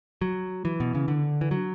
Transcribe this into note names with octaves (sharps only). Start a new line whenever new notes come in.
F#3
E3
B2
C#3
D3
E3
F#3